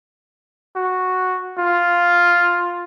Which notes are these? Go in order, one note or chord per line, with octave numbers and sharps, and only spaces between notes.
F#4
F4